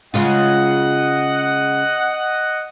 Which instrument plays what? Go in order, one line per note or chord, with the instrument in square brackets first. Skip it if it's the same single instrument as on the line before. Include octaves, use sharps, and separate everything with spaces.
[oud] C#3 G#3 F4 [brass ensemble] D#5 F#5